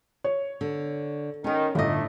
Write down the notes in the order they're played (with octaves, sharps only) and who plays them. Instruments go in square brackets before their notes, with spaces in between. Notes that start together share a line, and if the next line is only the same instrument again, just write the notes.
[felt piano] C#5
[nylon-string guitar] D3
[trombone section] D#3 [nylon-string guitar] C#4 A#4
[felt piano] G1 [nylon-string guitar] A2 D#5 [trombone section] A3 D4 D#4